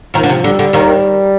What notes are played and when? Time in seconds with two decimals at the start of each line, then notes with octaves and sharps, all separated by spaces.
0.14 D#2 D#3 F3
0.23 D3
0.29 C3
0.44 D3 G3
0.59 D3
0.73 D#2 D#3